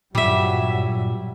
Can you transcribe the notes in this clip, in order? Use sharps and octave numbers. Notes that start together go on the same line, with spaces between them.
G2 A#2 F#3 G3 E5